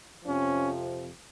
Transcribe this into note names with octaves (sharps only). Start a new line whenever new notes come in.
F2 C3 F3 C#4